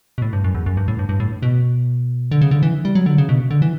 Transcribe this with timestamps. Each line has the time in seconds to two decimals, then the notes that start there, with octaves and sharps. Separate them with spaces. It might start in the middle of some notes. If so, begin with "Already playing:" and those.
0.18 B2
0.22 A2
0.33 G2
0.44 F#2
0.55 E2
0.66 F#2
0.77 G2
0.88 A2
0.99 G2
1.09 G2
1.20 A2
1.43 B2
2.32 D3
2.41 C#3
2.51 D3
2.63 E3
2.85 G3
2.95 F#3
3.06 D3
3.18 C#3
3.29 B2
3.51 D3
3.62 E3